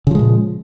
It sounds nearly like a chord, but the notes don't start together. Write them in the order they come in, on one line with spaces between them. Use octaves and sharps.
C#3 F3 G#3 A#2